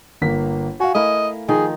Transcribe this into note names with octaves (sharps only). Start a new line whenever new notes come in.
G1 A#3 B6
F#4 F5 G#5
A3 E4 A#4 D#5
D#3 F3 D#4 G#4